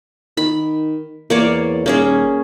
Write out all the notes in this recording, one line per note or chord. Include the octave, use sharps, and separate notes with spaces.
D#3 B5
E2 A#3 C#5 D5
D#1 A#3 C#4 G#4